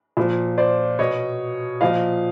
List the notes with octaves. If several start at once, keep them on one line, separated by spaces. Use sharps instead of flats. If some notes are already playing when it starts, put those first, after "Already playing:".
A#2 F3
C5 D5
B2 C#5 D#5
A#2 F3 D#5 F5